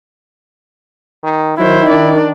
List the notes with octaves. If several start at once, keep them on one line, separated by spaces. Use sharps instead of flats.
D#3
D#3 F#3 E4 C5
D4 D5